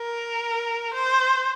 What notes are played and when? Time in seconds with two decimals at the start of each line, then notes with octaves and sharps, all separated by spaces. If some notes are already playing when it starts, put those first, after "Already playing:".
Already playing: A#4
0.94 C5